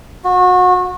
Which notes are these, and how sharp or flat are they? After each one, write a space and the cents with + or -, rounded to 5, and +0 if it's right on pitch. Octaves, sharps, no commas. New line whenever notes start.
F#4 -30